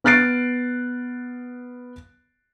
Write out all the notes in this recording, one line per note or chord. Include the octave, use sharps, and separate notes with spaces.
B3 F6 F#6 A6 C7 D7